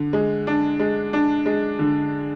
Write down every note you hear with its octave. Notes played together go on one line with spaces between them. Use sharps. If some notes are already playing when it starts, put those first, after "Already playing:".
Already playing: D3
G#3
D4
G#3
D4
G#3
D3